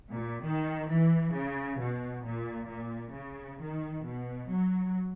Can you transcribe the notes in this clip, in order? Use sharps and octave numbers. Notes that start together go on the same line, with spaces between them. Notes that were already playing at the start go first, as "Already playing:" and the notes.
A#2
D#3
E3
C#3
B2
A#2
A#2
C#3
D#3
B2
F#3